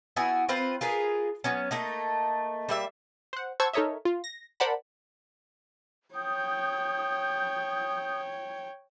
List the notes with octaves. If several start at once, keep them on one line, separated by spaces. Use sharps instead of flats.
B3 E4 F#4 G#5
C4 F4 B4 C5
F4 G#4 A#4 B4
F#3 B3 C#4
A3 A#3 D#4
G3 A#3 E5
C5 F#5
C5 F#5 A5 C#6 E6 G#6
D#4 A4 A#4 C#5 D#5 E5
F4
A#6
A#4 C5 D5 F#5 A5 B5
C#5 G5 D#6 G6